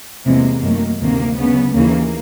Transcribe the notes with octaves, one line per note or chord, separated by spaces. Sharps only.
E2 C3 E3 G#3 A#3
F#2 D#3 F#3 A3
D2 C3 D#3 A#3
D2 C#3 F#3 B3
D#2 C#3 E3 A#3